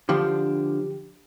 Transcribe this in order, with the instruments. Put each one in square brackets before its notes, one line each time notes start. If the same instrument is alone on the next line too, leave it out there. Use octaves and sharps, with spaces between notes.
[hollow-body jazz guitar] D3 F3 D4 [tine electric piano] G4